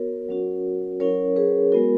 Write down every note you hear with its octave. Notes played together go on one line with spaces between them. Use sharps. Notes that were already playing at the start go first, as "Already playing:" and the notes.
Already playing: B3 F#4 A#4 C#5
F#3 C#4 F#4
F#3 C#4 E4 A#4 C#5
G#4 B4
G#3 B3 E4 F#4 A#4